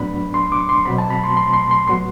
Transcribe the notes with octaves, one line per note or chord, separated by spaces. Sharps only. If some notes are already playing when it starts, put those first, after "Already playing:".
Already playing: A2 F#3 B3 D4 B5
C6
D6
C6
B2 F#3 C4 B5
A5
B5
C6
C6
C6
C6
A2 F#3 B3 C6